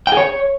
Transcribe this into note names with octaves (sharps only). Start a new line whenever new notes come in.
G5
G#4
C#5